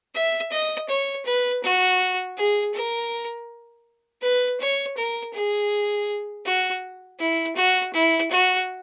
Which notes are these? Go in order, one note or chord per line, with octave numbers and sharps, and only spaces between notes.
E5
D#5
C#5
B4
F#4
G#4
A#4
B4
C#5
A#4
G#4
F#4
E4
F#4
E4
F#4